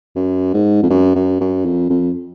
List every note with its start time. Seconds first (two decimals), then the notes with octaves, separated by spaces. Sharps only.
0.16 F#2
0.54 G#2
0.82 F2
0.90 F#2
1.15 F#2
1.41 F#2
1.65 F2
1.90 F2